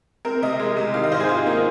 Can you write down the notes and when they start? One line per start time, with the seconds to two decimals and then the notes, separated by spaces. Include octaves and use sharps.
0.25 C4 A#4
0.42 C3 D#5
0.60 G#3
0.77 C3
0.94 D#3 F5
1.04 D#5
1.12 G#2 C5
1.20 G#4
1.29 G#2 F4
1.46 A#3 D#4